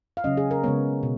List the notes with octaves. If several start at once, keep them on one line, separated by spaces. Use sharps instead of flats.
F5
C#3 F#3 C#4 D#5
G#4
A#4
C#3 G#3 B3 C#5
B2